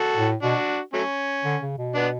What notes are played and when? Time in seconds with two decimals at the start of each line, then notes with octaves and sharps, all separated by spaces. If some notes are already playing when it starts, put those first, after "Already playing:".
Already playing: F#4 A4
0.17 A2
0.42 B2 D4 F#4
0.94 F#3 A3 C#4
1.44 D3
1.62 C#3
1.78 B2
1.95 B3 D4